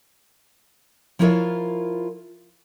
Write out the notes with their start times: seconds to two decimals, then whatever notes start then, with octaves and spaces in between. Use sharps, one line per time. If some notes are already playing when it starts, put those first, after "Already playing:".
1.19 F3 E4 F4 A#4 C#5 E5